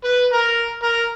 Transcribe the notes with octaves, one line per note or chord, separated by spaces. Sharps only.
B4
A#4
A#4